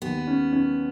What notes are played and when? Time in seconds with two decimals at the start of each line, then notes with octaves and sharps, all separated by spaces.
0.02 D#2 B3
0.27 C#4
0.53 C#4